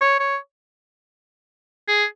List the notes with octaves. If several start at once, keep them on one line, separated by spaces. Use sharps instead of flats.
C#5
C#5
G#4